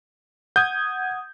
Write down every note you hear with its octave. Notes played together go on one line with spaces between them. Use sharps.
F#5 D#6 G6 G#6